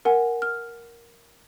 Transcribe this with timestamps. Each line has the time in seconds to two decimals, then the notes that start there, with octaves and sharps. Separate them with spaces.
0.05 A#4 F#5 G#5
0.42 F6